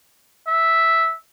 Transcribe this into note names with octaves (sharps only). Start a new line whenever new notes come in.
E5